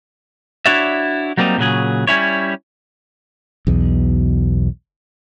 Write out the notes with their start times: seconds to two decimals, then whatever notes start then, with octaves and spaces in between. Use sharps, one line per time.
0.66 D4 E4 F#4 C#5 D5 E5
1.37 F#3 G3 A#3 C4 D#4
1.58 A#2 C#3 F#3 G#4
2.07 G3 C#4 E4 C#5
3.67 B1 E2 B2